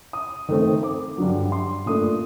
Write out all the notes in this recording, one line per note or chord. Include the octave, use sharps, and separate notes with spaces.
D#6
D#3 A3 C4
D6
G2 D3 F#3
C6
A#2 A3 D4 D#6